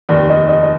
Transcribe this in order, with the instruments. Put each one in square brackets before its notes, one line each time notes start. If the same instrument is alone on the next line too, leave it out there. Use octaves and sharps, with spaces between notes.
[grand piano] F1 D#2 D#3 [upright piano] D5
[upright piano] D#5
D#5
D#5